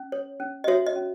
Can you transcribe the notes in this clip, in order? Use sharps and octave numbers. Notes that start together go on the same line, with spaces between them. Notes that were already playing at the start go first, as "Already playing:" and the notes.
Already playing: C#4
C#5
C#4
D#5
F#4 C#5 E5
D#5
C#4